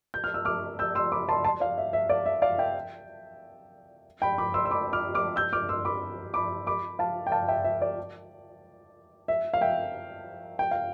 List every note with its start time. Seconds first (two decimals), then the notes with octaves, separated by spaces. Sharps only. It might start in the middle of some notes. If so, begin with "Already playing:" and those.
0.14 G6
0.24 F6
0.34 E6
0.45 D6 F6
0.79 E6 G6
0.95 C6 E6
1.12 B5 D6
1.29 A5 C6
1.44 A5 C6
1.60 D5 F5
1.78 E5
1.93 E5
2.09 D5 F5
2.26 E5
2.42 D5 F5
2.58 E5 G5
4.22 G5 B5
4.38 B5 D6
4.54 C6 E6
4.65 E6
4.71 B5 D6
4.93 D6 F6
5.15 D6 F6
5.36 E6 G6
5.53 D6 F6
5.69 C6 E6
5.85 B5 D6
6.34 B5 D6
6.67 B5 D6
6.99 F5 A5
7.27 G5
7.32 F5 A5
7.48 E5 G5
7.64 E5
7.82 D5
9.28 E5
9.54 F5
9.61 E5 G5
10.59 G5
10.71 F5